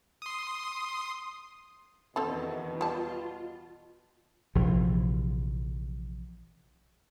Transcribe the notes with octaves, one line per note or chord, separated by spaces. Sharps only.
C6 D#6
E2 B2 D#3 C4 A4 A5
G3 F4 A5
A#1 C3 E3 F3